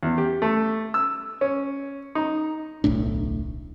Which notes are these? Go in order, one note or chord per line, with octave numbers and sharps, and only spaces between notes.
E2
G4
A3
E6
C#4
D#4
D1 B1 A2 D4